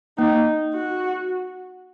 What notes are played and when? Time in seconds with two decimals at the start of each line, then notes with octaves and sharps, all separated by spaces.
0.18 A#3 D#4
0.74 F#4